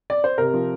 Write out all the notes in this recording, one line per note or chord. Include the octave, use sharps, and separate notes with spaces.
D5
C5
C3 A#4
F3